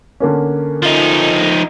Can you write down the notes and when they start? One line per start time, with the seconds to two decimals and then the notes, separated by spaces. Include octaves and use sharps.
0.20 D3 A#3 C#4
0.83 F3 D#4